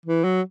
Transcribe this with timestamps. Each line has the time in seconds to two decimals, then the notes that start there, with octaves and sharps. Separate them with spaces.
0.05 E3
0.24 F#3